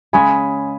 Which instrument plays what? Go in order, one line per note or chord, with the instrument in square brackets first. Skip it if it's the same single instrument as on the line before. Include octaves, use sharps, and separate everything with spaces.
[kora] C#3 G#3 C#4 [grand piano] G#5 B5